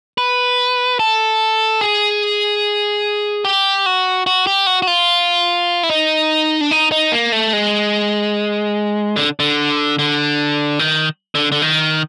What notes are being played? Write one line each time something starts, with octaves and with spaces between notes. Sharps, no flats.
B4
A4
G#4
G4
F#4
F#4
G4
F#4
F#4
F4
E4
D#4
D4
D#4
D#4
A#3
A3
G#3
D3
D3
D3
D#3
D3
D3
D#3